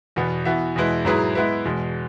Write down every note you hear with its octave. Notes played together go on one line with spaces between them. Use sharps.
E2 B2 B3
E3 B3 F#4 E5
E2 B2 G#3 E4 B4
G#2 F#3 E4 G#4 B4
G#3 B3 E4 B4 E5
E2 B2 G#3